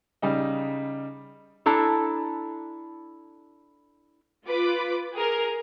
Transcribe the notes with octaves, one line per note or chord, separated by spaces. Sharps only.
C#3 G3 D#4
D4 E4 A4 A#5
F4 B4 D6
G#4 A#4